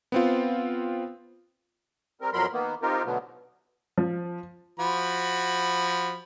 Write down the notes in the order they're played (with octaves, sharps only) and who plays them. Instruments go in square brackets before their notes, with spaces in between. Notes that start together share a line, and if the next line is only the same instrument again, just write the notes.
[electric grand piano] B3 C4 F4
[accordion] G3 C4 A#4
F2 B2 F#3 A#4 B5 C6
D#3 A#3 B3
C4 D#4 F4 G4 A#4
B2 D3 F#3 A3 B3
[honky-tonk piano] F3
[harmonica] F3 F#4 B5